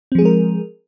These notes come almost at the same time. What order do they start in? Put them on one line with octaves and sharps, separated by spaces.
C4 F3 G#4 G#3 A#4